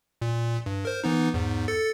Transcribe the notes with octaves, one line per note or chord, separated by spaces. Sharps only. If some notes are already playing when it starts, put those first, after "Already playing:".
A#2
G2
A#4 C5
E3 B3 D#4
E2 G#2
A4 A6 C#7